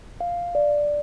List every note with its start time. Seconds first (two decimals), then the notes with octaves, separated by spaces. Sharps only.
0.20 F5
0.55 D5